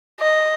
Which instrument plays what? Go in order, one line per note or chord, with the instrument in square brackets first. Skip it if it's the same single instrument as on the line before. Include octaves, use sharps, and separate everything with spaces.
[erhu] D#5